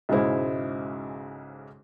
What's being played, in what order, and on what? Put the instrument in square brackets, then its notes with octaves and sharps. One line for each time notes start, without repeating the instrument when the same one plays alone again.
[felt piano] B1 G#2 C#3 G#3 E4 C5